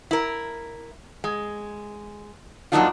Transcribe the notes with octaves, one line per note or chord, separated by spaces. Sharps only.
E4 A#4
G#3
F2 F#3 A#3 D4 D#4 F4